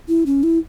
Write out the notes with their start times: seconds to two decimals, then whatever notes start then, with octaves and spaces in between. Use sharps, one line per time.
0.08 E4
0.26 C#4
0.43 E4